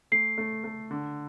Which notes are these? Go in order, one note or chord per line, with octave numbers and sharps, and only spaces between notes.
A3 C7
A3
A3
D3